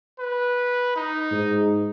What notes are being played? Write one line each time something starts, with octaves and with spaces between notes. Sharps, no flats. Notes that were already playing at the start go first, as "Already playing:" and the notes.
B4
D#4
G#2